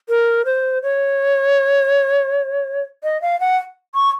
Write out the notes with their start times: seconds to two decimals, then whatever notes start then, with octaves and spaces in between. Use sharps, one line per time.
0.09 A#4
0.45 C5
0.83 C#5
3.03 D#5
3.22 F5
3.40 F#5
3.95 C#6